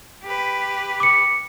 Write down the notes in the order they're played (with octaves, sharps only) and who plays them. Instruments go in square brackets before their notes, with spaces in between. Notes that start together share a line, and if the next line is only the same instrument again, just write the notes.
[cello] G4 B4
[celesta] D6 C#7